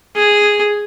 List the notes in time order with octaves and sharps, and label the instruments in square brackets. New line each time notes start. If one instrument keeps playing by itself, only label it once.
[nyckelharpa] G#4